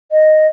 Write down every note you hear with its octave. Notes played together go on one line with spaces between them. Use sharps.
D#5